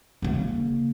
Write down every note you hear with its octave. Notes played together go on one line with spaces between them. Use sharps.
C#3 A#3